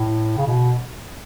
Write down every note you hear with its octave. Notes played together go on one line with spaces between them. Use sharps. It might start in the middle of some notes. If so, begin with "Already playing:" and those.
Already playing: A2
C#3
B2